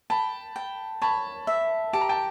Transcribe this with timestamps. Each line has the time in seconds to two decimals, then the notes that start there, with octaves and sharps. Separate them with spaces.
0.10 G5 A5 B5
0.56 G5
1.02 C#5 A5 B5
1.47 E5
1.93 G4 A5
2.01 A#5
2.09 G5 A5